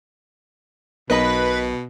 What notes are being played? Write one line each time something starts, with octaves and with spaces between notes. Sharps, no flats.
B1 B2 A#4 B4 D#5 B5